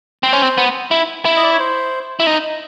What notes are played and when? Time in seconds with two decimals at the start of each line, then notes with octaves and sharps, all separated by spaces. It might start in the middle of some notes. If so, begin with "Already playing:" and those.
0.23 C4 C5
0.33 C#4
0.42 C4
0.57 B3
0.91 E4
1.25 E4
1.36 D#5
1.43 D5
1.52 C#5
1.59 C5
2.20 E4
2.27 D#4